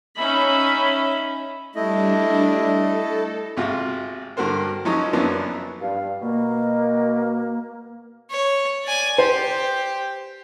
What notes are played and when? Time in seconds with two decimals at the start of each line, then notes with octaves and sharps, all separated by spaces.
0.17 C#4 D#4 E5 B5
1.75 G3 A3 D4 E4 D#5
2.76 A4
3.57 G#1 C3 F4 F#4
4.37 G2 D3 F#4 A#4 C5
4.85 F3 F#3 C#4 D#4 C#5
5.13 F#2 F3 A#3 B3 C#4 D4
5.81 G2 F5
6.22 B2 A#3
8.31 C#5
8.85 D5 G#5
9.18 G4 C5